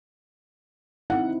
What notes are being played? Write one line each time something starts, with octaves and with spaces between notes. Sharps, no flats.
C4 D#4 E4 F#5